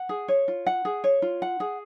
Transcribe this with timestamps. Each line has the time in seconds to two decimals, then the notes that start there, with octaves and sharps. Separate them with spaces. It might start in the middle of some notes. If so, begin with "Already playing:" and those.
Already playing: F#5
0.09 G#4
0.28 C#5
0.48 F4
0.66 F#5
0.85 G#4
1.04 C#5
1.22 F4
1.42 F#5
1.60 G#4